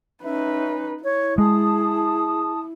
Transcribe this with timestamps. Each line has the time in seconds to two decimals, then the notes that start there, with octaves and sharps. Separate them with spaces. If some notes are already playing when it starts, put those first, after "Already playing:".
0.24 C#4 D#4 B4 E5
1.04 E4 C#5
1.38 G#3 G#4 A5 D#6